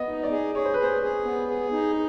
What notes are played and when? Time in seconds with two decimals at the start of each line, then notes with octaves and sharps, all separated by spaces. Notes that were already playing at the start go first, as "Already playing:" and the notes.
Already playing: B3 D#5
0.09 D#4
0.23 D5
0.31 G#4
0.55 G#4 C#5
0.65 C5
0.74 B4
0.79 G#4
0.84 C5
1.02 G#4
1.25 B3
1.49 G#4
1.72 D#4